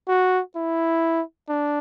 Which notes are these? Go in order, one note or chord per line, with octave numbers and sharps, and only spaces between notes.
F#4
E4
D4